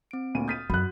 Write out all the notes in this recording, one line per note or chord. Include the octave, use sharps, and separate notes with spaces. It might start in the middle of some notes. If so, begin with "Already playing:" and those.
C4 D7
D2 A#2 D#7
D#6 F6 G6 A6 B6 D#7
F#2 F#4 B5 F#6